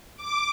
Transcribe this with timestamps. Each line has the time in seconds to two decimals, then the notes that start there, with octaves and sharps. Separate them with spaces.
0.16 D6